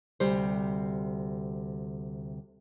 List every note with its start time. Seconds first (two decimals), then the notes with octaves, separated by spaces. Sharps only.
0.20 D2 C3 G3 C5